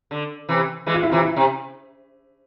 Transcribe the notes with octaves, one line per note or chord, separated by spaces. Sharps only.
D3
C3 E3
E3 G#3
F4
E4
C3 E3 F4
E4
C3